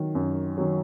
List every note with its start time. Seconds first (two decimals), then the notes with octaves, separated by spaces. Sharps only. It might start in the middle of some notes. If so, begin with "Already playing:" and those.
Already playing: D#3 F#3
0.15 F#2
0.57 D#3 F#3